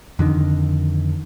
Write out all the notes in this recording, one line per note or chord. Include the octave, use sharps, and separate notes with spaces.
F2 D3 D#3